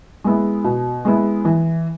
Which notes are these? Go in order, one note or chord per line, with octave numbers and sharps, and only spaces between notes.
G#3 B3 E4
B2
G#3 B3 E4
E3